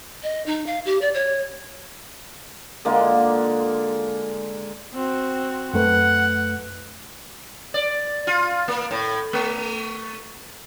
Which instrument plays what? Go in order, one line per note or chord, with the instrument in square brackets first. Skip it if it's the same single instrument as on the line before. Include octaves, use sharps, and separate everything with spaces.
[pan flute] D#5
D#4
F5
G4
D5
C#5
[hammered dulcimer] D3 G#3 A#3 F4
[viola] C4 F#4
[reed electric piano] F#2 A3 B4 [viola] F#5
[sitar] D5
F4
A#3
A2
A3